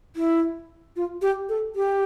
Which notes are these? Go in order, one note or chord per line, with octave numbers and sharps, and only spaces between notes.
E4
F4
G4
A4
G4